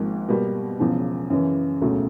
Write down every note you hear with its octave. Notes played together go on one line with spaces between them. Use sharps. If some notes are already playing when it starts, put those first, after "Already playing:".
Already playing: G#1 G#2 F3 A#3
B2 G3 A#3
E1 E2 C#3 F3
F#2 C#3 E3
E1 D2 C#3 F#3 A3